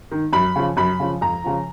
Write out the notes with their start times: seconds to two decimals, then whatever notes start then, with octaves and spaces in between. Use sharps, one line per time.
0.11 D#3
0.33 F#2 B5
0.56 C#3 F3
0.77 F#2 B5
1.00 C#3 F3
1.21 F2 A#5
1.44 C#3 F3